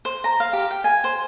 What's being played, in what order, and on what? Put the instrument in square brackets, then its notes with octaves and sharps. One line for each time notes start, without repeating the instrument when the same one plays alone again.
[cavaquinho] C5
A#5
F5
G4
G5
G#5
C5